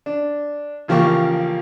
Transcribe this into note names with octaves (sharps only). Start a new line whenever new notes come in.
D4
A1 C#3 F3 A#3 G4 C#6